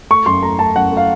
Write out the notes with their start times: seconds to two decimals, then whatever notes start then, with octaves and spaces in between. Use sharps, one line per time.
0.10 A3 C#6
0.26 F#2 C6
0.43 A3 A#5
0.59 A3 A5
0.75 F#2 F#5
0.92 A3 F5